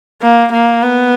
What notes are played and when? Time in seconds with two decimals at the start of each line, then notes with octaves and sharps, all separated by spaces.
0.22 A#3
0.52 A#3
0.83 B3